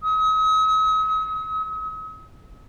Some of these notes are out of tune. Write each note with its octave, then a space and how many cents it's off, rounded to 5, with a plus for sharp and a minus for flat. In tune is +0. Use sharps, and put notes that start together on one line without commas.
D#6 +45